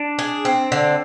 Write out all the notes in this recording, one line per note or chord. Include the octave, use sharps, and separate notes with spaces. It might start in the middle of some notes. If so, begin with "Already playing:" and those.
Already playing: D4
G#4
C4
D3